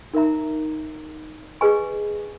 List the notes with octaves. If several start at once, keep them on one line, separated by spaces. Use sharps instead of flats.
D#4 A#4 E5 A#5
G#4 B4 D#5 G#5 C#6